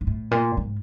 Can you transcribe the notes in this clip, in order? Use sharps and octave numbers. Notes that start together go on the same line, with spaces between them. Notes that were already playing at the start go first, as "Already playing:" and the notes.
G#2
A2
A#2
G#2